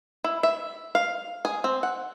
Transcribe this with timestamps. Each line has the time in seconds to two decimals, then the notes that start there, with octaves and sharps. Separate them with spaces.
0.24 E4
0.43 E5
0.95 F5
1.45 G#4
1.64 C4
1.83 F#5